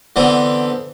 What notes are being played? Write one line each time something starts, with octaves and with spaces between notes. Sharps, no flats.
D3 E3 B3 C4